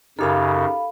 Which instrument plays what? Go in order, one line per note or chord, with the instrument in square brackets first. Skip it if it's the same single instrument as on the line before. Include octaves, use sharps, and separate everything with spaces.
[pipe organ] F#2 C#3 [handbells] D#4 G4 A#4 [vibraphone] A4 F5 B5